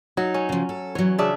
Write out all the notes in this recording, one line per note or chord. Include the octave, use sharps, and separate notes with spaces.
F#3 D#4
C#4
C#3 F3
A4
E3 F#3 C#5
C#3 D4 E5